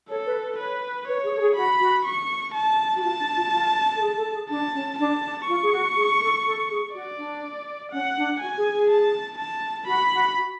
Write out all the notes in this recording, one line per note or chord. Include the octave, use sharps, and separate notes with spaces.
A4 C#5
B4
B4
B4 C#5
B4 C#5
G#4
A4
G#4
F#4 B5
F#4
C#6
A5
F#4
F4 A5
D4
F4
F#4
F4
A4
G#4
A4
G#4
D4 A5
C#4
D4 A5
D4
F4 C#6
G#4
F#4
G#4
A4
A4
G#4
F#4 D5
D4
C#4 F#5
D4
F#4 G#5
G#4
G#4
A5
A5
F#4 B5
F#4
F#4